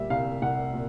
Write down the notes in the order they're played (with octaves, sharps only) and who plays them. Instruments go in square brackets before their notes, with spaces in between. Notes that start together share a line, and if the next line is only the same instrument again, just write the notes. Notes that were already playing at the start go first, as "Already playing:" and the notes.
Already playing: [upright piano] A#2 G3 E5
C2 F5
C2 F#5
A#2